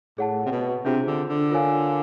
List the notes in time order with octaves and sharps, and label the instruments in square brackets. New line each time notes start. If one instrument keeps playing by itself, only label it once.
[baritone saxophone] A2 [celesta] G#4 C#5 F#5 A5
[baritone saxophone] C3
B2
[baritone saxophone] C3 [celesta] D4 F4 G#4 C5
[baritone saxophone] D3
D3
[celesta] F4 A#4 C#5 F5 G#5